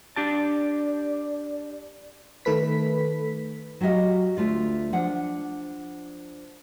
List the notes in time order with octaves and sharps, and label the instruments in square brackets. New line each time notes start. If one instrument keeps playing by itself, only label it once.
[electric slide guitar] D4 G4 A5 [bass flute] D5
[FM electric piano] D#3 A3 A4 B4 B6
[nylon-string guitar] F#3 F#4 G4 D#5 F5
D2 A3 F4 D5
F3 D4 F#5